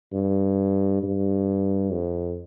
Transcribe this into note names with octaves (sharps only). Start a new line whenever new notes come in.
G2
G2
F2